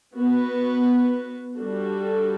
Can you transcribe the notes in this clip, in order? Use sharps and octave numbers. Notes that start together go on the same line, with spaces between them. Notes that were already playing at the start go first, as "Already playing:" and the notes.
B3 F#4 B4
G3 D4 F#4 A4